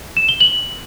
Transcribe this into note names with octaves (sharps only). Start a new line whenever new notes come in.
E7
G7
F#7